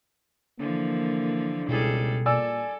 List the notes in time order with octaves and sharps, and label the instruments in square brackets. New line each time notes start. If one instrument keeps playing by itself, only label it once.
[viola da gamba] D3 E3 F3 [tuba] A#3
[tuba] C#2 [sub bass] B2 [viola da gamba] G3 G#4 A4
[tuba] A#2 [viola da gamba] A4 [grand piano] D5 G#5 E6